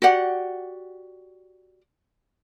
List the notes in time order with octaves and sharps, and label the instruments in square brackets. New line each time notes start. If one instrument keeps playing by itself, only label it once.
[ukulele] F#4 G4 D5 F#5